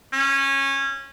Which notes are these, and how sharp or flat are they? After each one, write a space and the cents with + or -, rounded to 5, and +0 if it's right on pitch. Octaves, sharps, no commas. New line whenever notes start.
C#4 -20